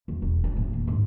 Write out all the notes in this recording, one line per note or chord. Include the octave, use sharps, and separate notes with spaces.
E2
E1
D4
A2
D#2
G#2